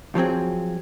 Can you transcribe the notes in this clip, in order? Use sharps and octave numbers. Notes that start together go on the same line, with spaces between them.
F3 F#3 C4 G#4